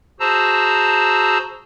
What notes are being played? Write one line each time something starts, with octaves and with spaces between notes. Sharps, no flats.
F#4 G#4 C5 A5 A#5 E6